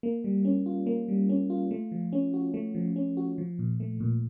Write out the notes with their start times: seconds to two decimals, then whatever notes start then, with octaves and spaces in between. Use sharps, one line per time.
0.03 A#3
0.24 G3
0.45 C#4
0.66 F4
0.86 A#3
1.08 G3
1.29 C#4
1.50 F4
1.71 A3
1.92 F3
2.13 C#4
2.34 F#4
2.54 A3
2.75 F3
2.96 C#4
3.17 F#4
3.38 F3
3.59 A#2
3.80 A3
4.00 A#2